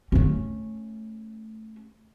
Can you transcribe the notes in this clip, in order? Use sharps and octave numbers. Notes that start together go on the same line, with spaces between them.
A3 C#4